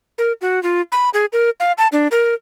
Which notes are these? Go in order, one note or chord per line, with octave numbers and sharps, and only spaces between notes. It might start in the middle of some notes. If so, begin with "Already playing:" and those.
A#4
F#4
F4
B5
G#4
A#4
F5
A5
D4
A#4